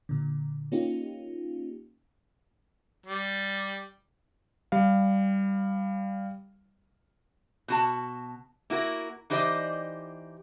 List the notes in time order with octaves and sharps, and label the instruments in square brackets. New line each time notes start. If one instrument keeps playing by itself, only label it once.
[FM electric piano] A#2 D3
A#3 C#4 D#4 F4 G4
[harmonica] G3
[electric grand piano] G3 F5
[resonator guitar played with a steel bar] B2 F#4 A5
A#3 E4 F#4 A#4
E3 D#4 G4 C5 D5 D#5